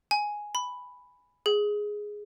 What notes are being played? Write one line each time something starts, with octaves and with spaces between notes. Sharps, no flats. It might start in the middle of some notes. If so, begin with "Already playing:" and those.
G#5
B5
G#4